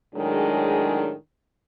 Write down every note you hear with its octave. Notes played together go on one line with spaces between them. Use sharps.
A2 D#3 F#3 G#3 D4 G#4